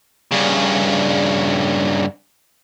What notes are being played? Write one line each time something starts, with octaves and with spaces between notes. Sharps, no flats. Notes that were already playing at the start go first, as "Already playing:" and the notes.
G2 C#3